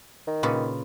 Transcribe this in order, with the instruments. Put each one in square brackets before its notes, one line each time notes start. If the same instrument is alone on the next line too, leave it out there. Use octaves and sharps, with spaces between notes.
[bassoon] D#3
[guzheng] A#2 C#3 B4